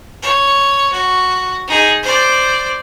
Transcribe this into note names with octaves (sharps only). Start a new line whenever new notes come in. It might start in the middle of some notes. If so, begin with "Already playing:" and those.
C#5
F#4
D#4 G#4
C5 D5